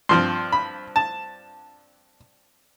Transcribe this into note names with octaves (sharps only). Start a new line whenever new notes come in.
G2 F3 C4 C6
B5
A5